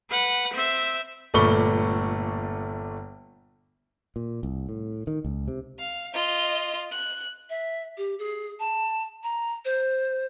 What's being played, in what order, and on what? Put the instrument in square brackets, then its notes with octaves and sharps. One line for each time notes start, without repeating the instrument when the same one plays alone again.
[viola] B4 F#5
C4 E5
[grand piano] G1 A#2 A3 B5 C#6 G7
[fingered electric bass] A#2
C2
A2
D#3
C#2
C3
[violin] F5
F4 D#5
F#6
[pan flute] E5
G4
G#4
A5
A#5
C5